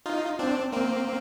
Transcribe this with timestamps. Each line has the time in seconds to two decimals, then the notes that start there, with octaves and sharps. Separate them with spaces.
0.06 D#4 F4
0.39 C4 D4
0.73 A#3 C4